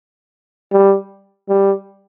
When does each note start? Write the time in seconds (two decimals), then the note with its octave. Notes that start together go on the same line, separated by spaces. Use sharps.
0.72 G3
1.49 G3